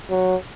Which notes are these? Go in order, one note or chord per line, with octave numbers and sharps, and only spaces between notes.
F#3